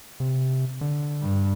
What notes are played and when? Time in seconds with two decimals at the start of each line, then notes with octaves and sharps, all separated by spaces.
0.20 C3
0.81 D3
1.21 G2